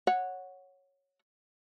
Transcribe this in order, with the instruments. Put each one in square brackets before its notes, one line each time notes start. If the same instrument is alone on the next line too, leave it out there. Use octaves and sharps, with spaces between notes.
[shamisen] C#5 F#5